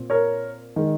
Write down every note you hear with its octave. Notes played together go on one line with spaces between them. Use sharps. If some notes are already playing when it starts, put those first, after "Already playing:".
Already playing: A#2 C4
A#4 C#5
D#3 G#3